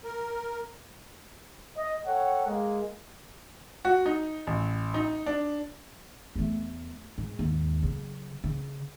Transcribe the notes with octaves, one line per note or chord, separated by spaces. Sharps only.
A#4
D#5
A4 C#5 F#5 G5
G#3 A#3
F#4
D#4
A1
D#4
D4
E2 A3
G#2
D#2 G#2
C#3 F#3
C#3